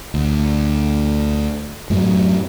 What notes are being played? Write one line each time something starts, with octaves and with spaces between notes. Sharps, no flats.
D2
F#2 A2 F#3